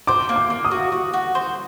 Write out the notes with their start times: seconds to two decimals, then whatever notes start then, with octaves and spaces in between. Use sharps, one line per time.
0.07 C5 D6
0.29 A#3
0.36 D6
0.50 A#3
0.65 D#6
0.71 F#4
0.92 F#4
1.13 F#4
1.35 C5